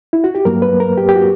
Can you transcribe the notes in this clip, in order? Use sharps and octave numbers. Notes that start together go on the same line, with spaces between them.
E4
F#4
G4
G2 F#3 A#3 A#4
B4
A#4
G4
G4
F#4